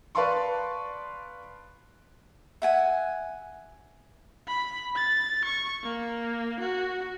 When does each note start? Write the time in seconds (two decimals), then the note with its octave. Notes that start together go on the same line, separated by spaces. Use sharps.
0.15 B4 D5 F5 A5 C6 C#6
2.62 E5 F#5 G#5
4.48 B5
4.95 A6
5.45 C#6
5.83 A#3
6.60 F#4